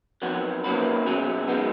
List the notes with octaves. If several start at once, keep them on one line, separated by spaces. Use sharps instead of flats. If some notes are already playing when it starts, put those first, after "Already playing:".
F2 D#3 F#3 B3 F#4
D#3 A#3 C#4 F#4 B4
B2 F#3 C#4 G#4
D#3 G#3 B3